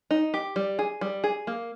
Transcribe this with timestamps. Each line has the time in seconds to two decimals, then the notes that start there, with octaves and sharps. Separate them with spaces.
0.11 D#4
0.34 G4
0.56 G3
0.79 G#4
1.01 G3
1.24 G#4
1.47 A#3